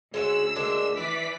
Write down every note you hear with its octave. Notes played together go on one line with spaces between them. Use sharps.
D2 G#3 C#4 F#5 E6
G#3 A#3 D4
E3 B4 D5 B6